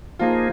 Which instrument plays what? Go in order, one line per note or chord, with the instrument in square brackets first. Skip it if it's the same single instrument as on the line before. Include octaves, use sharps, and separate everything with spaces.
[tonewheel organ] F3 A#3 D#4 G#4 [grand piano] F4